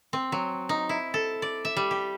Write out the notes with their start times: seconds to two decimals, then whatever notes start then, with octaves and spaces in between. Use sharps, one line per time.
0.13 C4
0.32 F#3
0.69 D#4
0.89 E4
1.14 A4
1.42 D5
1.65 E5
1.77 G3
1.91 G4